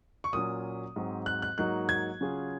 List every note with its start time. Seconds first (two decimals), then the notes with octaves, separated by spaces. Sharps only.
0.24 C#6
0.33 A#2 F#3 C#4 D#6
0.96 G#2 F#3 C4
1.26 F#6
1.42 F#6
1.58 G#2 F#3 A#3 D#4 F#4 F#6
1.89 G#6
2.21 C#3 F#3 C#4 F4 G#4